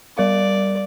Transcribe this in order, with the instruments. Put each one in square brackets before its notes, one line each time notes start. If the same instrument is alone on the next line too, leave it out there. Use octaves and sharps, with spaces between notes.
[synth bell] G3 A#4 F5 [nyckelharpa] D5